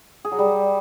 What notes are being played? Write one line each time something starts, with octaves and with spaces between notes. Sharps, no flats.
G#4
F#3
G3